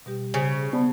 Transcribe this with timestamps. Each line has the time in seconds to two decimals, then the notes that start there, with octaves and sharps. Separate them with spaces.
0.06 B2 G3 G4
0.34 C#3 C5
0.73 B3 D5 A5 B5